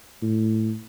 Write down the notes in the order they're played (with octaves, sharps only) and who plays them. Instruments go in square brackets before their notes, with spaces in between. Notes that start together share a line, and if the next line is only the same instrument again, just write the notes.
[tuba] A2